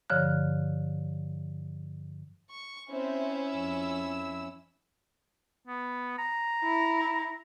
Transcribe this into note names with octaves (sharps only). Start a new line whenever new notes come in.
G2 D3 F3 C#5 F6 F#6
C#6
C4 C#4 E4 C5 E5
F2 E6
B3
A#5
E4